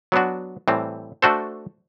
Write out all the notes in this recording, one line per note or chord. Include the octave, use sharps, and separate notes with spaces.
F#3 B3 D4 F#4
A2 E3 G3 C4
A3 D4 F#4 A4 C5